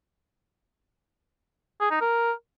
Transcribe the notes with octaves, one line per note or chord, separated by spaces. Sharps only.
G#4
D#4
A#4